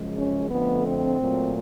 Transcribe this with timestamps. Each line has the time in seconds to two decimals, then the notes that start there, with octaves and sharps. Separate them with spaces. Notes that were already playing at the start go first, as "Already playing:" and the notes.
Already playing: F#2 C#3 F3 G#3
0.18 C#4
0.51 F2 D3 F3 A3 B3
0.85 C4
1.20 A#2 F#3 A3